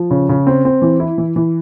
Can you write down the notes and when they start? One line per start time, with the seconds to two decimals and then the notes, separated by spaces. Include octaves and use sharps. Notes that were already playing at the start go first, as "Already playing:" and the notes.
Already playing: F3
0.11 C#3
0.29 C#3
0.47 C4
0.65 C4
0.82 E3
1.00 E4
1.18 E3
1.36 E3